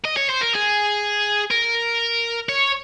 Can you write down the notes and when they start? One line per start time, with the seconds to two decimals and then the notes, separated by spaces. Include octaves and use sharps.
0.05 D#5
0.17 C#5
0.29 C5
0.41 A#4
0.54 G#4
1.51 A#4
2.49 C#5